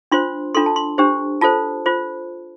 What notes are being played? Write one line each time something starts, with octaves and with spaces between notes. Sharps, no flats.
D4 F4 C5 C6
D4 F4 A4 C6
A5
C6
D4 G4 C5
F4 A4 C5 A5
F4 C5